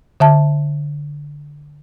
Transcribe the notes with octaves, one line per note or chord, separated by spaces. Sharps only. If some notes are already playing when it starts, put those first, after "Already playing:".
D3 E5 A5